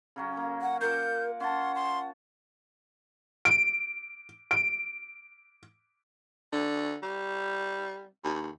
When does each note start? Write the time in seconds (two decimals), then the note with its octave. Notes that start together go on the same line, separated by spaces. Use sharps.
0.16 C#3 F#3 C#4
0.37 A#3
0.62 F#5
0.81 F4 A#4 F#5 D6 G6
1.40 C#4 F#5 A5 C6
1.75 C6
3.45 D7
4.51 D7
6.53 D3
7.03 G3
8.24 D#2